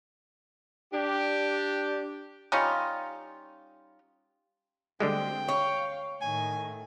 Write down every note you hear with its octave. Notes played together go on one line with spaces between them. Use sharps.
D4 G4
G3 C#4 D#4 F4
D2 D3 G3 G#3 C4 G5
C#5 F5
A2 D#3 A3 G#5